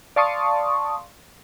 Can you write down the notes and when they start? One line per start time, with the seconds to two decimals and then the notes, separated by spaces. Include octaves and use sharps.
0.16 D5 F5 A5 C6 C#6 D#6